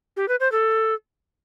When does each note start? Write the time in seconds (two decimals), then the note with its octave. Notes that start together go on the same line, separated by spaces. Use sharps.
0.17 G4
0.28 B4
0.40 C5
0.52 A4